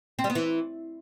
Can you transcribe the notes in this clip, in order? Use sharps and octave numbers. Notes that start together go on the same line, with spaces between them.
C4
G3
B3
E3